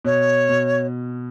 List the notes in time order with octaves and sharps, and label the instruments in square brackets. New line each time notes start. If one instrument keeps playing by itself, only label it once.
[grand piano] B2 [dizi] C#5
[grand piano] B2